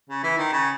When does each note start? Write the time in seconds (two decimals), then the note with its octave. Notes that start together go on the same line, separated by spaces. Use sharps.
0.09 C#3
0.23 E3
0.38 D#3
0.52 C#3